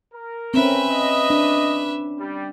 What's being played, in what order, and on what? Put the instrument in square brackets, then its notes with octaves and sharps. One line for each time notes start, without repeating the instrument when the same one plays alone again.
[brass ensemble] A#4
[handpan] C4 C#4 [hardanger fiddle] B4 E5
[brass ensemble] D#5
[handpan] D4
[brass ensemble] G3